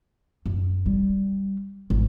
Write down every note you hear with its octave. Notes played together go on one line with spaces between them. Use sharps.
F#2
G3
G#1